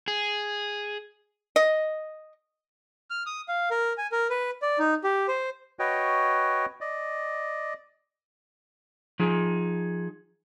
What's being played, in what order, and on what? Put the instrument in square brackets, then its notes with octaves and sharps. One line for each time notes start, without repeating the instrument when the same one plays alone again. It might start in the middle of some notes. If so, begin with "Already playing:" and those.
[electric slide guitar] G#4
[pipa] D#5
[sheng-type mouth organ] F6
D#6
F5
A#4
G#5
A#4
B4
D5
D#4
G4
C5
[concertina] F#4 B4 C#5 D#5 G5
D5 D#5
[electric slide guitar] F3 D#4 G#4